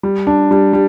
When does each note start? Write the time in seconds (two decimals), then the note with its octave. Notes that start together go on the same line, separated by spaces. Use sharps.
0.03 G3
0.27 D4
0.51 G3
0.73 G3